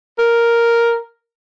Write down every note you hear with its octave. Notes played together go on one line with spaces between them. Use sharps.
A#4